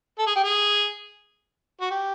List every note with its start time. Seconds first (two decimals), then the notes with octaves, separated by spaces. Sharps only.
0.19 A4
0.27 G#4
0.36 G4
0.44 G#4
1.81 F#4
1.90 G4